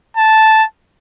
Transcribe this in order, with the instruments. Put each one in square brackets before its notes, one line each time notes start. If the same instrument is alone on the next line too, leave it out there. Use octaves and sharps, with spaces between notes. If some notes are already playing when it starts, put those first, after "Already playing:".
[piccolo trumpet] A5